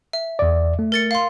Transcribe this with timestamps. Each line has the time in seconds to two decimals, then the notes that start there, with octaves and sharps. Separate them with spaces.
0.13 E5
0.39 E2 D5
0.79 A3
0.92 A#4 A6 C#7
1.11 F5 C6